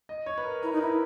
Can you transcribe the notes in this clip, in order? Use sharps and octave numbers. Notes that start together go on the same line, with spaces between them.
D#5
C#5
B4
A#4
E4 A#4
D#4
B4
E4 A#4